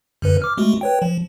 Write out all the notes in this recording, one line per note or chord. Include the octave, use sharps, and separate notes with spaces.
F#2 D3 B4
D6 F6
G#3 A3 F#4
B4 C#5 G5
F3